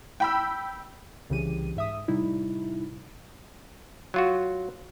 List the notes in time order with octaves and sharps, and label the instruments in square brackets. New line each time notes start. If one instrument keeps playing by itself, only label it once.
[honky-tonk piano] G5 B5 E6
[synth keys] C2 C#3 E3 G4 D#7
G#2 E5 D#6
A2 C3 G3 D#4 E4
[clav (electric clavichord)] F#3 F4 F#4